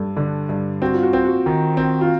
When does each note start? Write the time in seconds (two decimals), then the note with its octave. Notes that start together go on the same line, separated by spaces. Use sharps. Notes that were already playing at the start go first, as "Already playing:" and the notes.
Already playing: G2 A4
0.17 D3
0.49 G2
0.82 C4 F#4
0.94 F4
1.03 F#4
1.13 C4
1.25 F#4
1.46 D#3
1.77 C4
2.01 F4